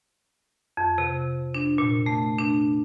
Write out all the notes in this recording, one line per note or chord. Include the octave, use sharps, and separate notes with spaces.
F2
C3
D4
A#2
A3
D4